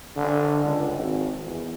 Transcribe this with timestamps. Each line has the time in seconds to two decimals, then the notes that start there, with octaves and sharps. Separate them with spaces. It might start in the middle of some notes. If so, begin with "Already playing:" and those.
0.16 D3
0.64 C#2
0.96 G#1
1.43 E2